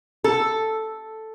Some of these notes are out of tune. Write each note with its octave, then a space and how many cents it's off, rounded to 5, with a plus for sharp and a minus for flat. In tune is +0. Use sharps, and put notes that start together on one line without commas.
A4 +0